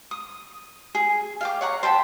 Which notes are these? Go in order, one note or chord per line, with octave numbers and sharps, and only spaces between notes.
D#6
G#4
F5 G5 D6
C#5 F#5 A#5
C5 G5 A5 B5